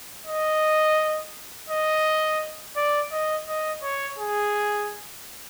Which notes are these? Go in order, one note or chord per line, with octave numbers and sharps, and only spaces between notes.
D#5
D#5
D5
D#5
D#5
C#5
G#4